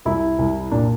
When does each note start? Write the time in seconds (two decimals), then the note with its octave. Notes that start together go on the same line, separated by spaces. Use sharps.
0.05 C2 E4
0.39 C2
0.71 A#2 D4